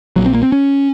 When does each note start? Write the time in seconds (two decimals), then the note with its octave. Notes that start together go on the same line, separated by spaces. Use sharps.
0.16 A#1 A#2 F#3
0.26 C4
0.34 A#3
0.43 C4
0.52 C#4